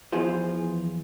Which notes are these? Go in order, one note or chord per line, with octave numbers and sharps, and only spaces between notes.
E2 E3 F3 F4 G#4 C5